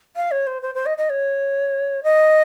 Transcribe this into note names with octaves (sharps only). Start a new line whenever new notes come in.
F5
C#5
C5
C5
C5
D#5
D#5
C#5
D#5